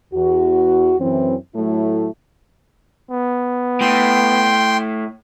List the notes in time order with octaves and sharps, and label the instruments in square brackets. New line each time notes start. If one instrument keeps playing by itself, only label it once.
[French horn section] E2 F#4
F#2 E3 C4
A2 F#3 A3 E4
[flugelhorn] B3
[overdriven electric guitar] A2 [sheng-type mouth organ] G5 C6